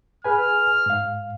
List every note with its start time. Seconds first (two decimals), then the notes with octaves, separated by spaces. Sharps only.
0.24 G#4 B4 G#5 F6
0.86 G#2 F5